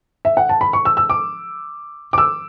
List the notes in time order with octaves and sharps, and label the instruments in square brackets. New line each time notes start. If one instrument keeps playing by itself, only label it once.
[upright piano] E5
F#5
A5
B5
C#6
E6
E6
D6
D6
E6